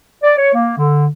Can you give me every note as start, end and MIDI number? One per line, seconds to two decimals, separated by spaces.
0.24 0.36 74
0.38 0.50 73
0.54 0.76 58
0.78 1.07 50